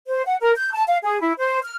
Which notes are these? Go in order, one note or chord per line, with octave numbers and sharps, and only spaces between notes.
C5
F#5
A#4
G6
A5
F5
G#4
E4
C5
F6